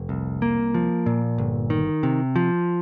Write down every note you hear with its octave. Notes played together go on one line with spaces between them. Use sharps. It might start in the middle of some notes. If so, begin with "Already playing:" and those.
Already playing: F1
C2
A#3
F3
A#2
G1
D#3
C3
F3